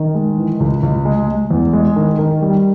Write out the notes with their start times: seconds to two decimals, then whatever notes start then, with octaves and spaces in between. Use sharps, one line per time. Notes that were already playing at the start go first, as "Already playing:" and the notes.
Already playing: D#3
0.15 G#3
0.38 E3
0.60 C#2
0.83 C#2
1.05 G#3
1.28 G#3
1.51 E2
1.73 G#3
1.96 D#3
2.19 D#3
2.42 G3